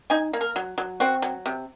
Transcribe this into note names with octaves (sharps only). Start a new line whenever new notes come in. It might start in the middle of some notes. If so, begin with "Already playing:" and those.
D#4 G#5
A#3
A#4
F#3
F#3
C4 F#4
F#3
C3